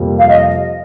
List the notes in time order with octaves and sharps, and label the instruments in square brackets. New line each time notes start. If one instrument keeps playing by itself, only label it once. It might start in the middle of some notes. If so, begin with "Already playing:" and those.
Already playing: [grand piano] F2 C3 G3 A#3
[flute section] F5
D#5